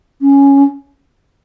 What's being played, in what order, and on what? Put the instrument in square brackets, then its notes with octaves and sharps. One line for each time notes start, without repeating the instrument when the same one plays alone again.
[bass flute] C#4